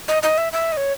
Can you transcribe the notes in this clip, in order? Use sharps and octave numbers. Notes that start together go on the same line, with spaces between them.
D#5
D#5
E5
E5
D#5
C#5